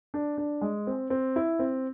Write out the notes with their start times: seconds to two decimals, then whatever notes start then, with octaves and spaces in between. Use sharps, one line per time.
0.14 D4
0.38 D4
0.61 G#3
0.87 C4
1.10 C4
1.36 E4
1.59 C4